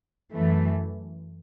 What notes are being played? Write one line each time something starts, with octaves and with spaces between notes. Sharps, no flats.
F#2 E3 A3